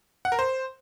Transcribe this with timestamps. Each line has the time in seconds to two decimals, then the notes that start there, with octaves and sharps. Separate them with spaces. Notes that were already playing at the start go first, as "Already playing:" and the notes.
0.25 F#5
0.32 A#4
0.39 C5